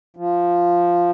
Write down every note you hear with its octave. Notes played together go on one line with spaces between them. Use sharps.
F3